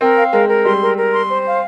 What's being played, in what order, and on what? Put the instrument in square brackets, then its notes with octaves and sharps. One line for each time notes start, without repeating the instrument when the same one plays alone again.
[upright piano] C4 [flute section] A#4
[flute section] F5
[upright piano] G#3 [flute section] A#4
[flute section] A#4
[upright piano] G3 [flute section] C6
[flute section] A#4
A#4
C6
C5
F5